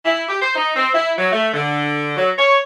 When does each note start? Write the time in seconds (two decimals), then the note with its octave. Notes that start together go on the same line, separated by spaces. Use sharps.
0.05 E4
0.28 G4
0.42 C5
0.56 D#4
0.76 C4
0.94 E4
1.17 F#3
1.31 A3
1.54 D3
2.17 F#3
2.38 C#5